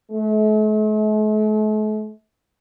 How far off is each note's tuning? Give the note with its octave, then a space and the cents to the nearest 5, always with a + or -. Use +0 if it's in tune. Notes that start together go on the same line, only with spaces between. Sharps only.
A3 -45